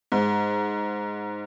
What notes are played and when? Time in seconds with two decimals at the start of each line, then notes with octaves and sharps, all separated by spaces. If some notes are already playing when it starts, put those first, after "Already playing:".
0.12 G#2